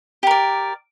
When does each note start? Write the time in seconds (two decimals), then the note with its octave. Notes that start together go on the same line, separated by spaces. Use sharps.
0.23 G4
0.27 A#4
0.31 D5